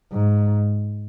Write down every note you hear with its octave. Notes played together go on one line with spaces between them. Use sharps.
G#2